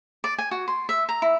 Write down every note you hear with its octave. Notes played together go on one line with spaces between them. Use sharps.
D5
G#5
F#4
C6
E5
A#5
E4